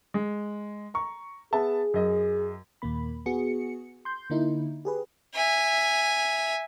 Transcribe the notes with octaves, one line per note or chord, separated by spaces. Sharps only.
G#3
A#5 C#6
B3 G#4 E5 A5
F#2 D#5
D#2 A#2 A#3 B5
B3 F#4 G#4 C#7
C6 G6
D3 A#3 D#4 E4
G4 G#4 B4
E5 G#5